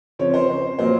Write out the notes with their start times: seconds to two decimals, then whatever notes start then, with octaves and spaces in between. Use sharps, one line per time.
0.19 C#3 F3 C4 C#5
0.34 C5
0.49 C5
0.79 A#2 F#3 A#3 C5